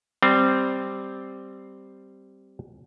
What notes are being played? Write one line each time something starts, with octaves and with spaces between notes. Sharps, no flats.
G3 C4